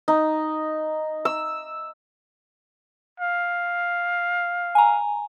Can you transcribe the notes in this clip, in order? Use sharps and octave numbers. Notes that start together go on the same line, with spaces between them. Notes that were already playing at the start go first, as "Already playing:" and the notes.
D#4
E6
F5
G#5 A#5